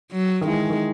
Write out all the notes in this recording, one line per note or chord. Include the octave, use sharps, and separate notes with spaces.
F#3
D#3
E3 G#3
D#3